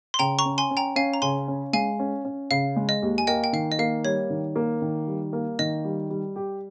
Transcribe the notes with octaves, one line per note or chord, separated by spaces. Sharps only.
C6
C#3 G5 A#5
A#5 C#6
C#4
G#5 C6
C#4
G5 A#5
C#4 F5 G#5
A#5
C#3 G#5 C6
C#4
G#3 F5 G#5
C#4
C#4
C#3 F5
G#3
D#5
D#2
G#5
A#3 D#5 G5
G5
D#3 F5
D#5
A#3 F5
G3 C#5
D#3
A#3
D#3
G3
A#3
D#3 D#5
G3
G3
G4